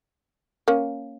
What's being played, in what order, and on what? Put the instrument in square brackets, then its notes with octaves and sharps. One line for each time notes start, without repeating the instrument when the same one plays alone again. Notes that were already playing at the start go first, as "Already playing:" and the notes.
[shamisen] A#3 C#4